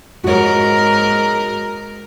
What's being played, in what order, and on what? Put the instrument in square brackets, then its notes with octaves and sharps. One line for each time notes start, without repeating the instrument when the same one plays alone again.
[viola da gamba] G#2 A#4 [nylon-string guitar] F#4 C#5